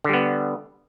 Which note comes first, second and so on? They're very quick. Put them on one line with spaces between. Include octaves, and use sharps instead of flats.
D3 G3 B3